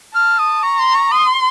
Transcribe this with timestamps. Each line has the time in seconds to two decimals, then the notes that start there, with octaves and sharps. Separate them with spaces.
0.15 A5 F6
0.39 D#6
0.63 A#5 C#6
0.79 C6
0.95 C#6
1.11 C6 D#6